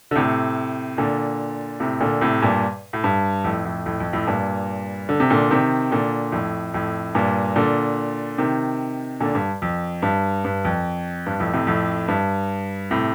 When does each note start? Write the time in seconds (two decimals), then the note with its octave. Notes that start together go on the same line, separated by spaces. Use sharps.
0.11 D3
0.15 A2 C3
0.98 A#2 D3
1.80 A2 C3
2.00 A#2 D3
2.21 A2 C3
2.42 G2 A#2
2.93 A2
3.04 G2
3.44 F2 A2
3.65 F2 A2
3.86 F2 A2
4.00 F2
4.13 F2 A2
4.27 G2 A#2
5.09 D3
5.20 C3
5.30 A#2 D3
5.51 C3 D#3
5.91 A#2 D3
6.32 F2 A2
6.74 F2 A2
7.15 G2 A#2
7.56 A#2 D3
8.38 C3 D#3
9.20 A#2 D3
9.35 G2
9.62 F2
10.02 G2
10.45 G2
10.65 F2
11.26 G2
11.39 F2 A2
11.53 A2 C3
11.67 F2 A2
12.08 G2
12.91 A2 C3